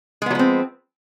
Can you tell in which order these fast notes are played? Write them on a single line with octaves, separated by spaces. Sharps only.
G#3 B3 F#3 F3 C4